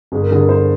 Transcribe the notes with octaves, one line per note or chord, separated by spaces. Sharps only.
G1 G#4
A#4
G2 D3 G#4
A#4
G1 C5